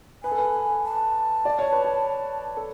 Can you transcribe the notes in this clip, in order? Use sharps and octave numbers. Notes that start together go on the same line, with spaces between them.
B4 G#5
A4
B4
A5
D5
C#5
B4
C#5
A4